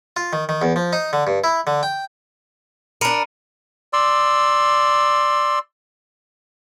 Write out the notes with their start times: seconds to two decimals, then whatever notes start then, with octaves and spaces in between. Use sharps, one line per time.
0.16 F4
0.33 D#3
0.49 D#3
0.62 E2
0.76 F3
0.93 D#4
1.13 D3
1.27 G2
1.44 E4
1.67 D3
1.83 G5
3.01 D4 A#4 B5 C#7 D#7
3.93 D5 C6 E6